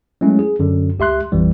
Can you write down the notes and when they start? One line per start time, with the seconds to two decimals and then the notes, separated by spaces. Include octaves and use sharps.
0.21 F#3 G#3 A3 C#4 E4
0.39 G#4
0.59 F#2 D3
0.99 C#2 G4 E5 C6 F#6
1.32 A1 F2 E3 G3